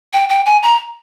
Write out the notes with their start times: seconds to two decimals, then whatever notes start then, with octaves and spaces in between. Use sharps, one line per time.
0.13 G5
0.29 G5
0.46 G#5
0.63 A#5